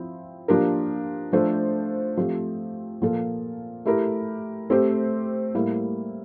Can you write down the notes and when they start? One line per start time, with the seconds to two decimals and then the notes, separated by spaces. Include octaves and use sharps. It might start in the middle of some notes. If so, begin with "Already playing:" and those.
Already playing: F3 C4 E4
0.48 F3 A#3 D4 G4 A#4
1.33 F3 A3 D4 A4 C5
2.17 F3 A3 C4 G4
3.02 A#2 F3 A#3 F4 A4
3.85 A3 E4 G4 A#4
4.70 A3 C4 G4 C5
5.55 A2 G3 A#3 E4